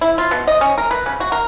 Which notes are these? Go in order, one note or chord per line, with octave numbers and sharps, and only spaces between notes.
E4
F4
B2
D#5
C#4
A#4
B4
C#3
F#4
A#4